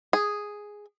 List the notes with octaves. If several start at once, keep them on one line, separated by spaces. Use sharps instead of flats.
G#4